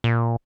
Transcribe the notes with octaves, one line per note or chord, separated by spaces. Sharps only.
A#2